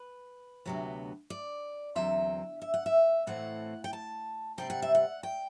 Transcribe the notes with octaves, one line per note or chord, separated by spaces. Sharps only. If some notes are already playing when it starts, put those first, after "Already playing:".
Already playing: B4
D2 C3 F#3 B3
D5
E2 D3 F#3 C4 E5
E5
F#5
E5
A2 E3 A3 C4 F#5
G5
A5
C3 G3 C4 G5
F#5
E5
F#5
G5